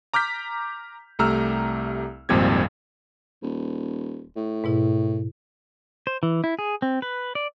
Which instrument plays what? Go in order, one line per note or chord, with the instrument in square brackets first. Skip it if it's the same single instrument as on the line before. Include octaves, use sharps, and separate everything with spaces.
[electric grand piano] A#5 D6 F6 G6 B6
C2 A3 G4 A#5 E6 F6
G#1 F2 A#2 F3 G3 G#6
[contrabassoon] D#1
A2
[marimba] G#2 B2 E4
[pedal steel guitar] C5
E3
E4
G#4
C4
B4
D5